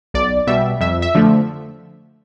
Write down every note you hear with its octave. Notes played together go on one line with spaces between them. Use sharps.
B1 D5
B2 G3 E5
F2 E5
E5
D3 F3 A3